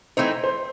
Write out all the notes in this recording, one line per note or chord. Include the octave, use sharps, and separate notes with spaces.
E3 A3 C4 D#4 C5
C5